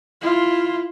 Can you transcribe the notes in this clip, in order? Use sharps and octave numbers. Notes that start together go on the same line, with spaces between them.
E4 F4